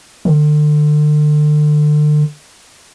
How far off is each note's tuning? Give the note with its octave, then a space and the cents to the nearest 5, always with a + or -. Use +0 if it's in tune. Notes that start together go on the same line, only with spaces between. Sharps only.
D3 +35